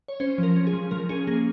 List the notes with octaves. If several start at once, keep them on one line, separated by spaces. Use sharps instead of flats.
C#5
C#4 C5
F3 A#4
C#4
G#4
F3
F3 A#4
C#4 G#4
A#3 G#4